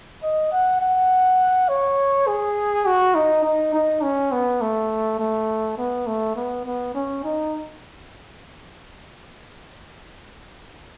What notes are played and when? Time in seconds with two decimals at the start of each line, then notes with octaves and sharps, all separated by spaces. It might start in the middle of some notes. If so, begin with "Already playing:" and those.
0.23 D#5
0.52 F#5
0.81 F#5
1.69 C#5
2.27 G#4
2.86 F#4
3.15 D#4
3.44 D#4
3.74 D#4
4.03 C#4
4.32 B3
4.61 A3
5.19 A3
5.78 B3
6.07 A3
6.36 B3
6.65 B3
6.95 C#4
7.24 D#4